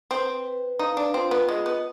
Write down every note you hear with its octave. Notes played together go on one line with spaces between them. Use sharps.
C4 B4
B4
D#4 F5
D4
C4 F4
B3
G#3 D#5
B3